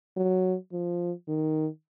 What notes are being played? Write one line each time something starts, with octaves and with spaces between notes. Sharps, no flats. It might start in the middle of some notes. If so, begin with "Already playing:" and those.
F#3
F3
D#3